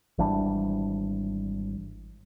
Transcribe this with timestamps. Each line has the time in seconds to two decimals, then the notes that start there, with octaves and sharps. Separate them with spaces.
0.18 G#1 E3 G3 D4